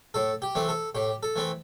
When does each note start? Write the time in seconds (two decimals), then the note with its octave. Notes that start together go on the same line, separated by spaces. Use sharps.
0.14 A2 A4
0.42 G4
0.55 E3 A3 C4
0.69 A4
0.95 A2 G4
1.23 A4
1.36 E3 A3 C4